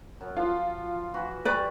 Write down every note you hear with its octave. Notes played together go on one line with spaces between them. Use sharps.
F#2
F3 F4
E3 F#4 B4
E3 G3 B4 D5 C#6